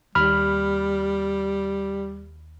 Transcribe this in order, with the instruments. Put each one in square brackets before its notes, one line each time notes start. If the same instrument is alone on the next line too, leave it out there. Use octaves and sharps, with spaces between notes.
[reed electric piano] D#2 B5 F6 [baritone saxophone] G3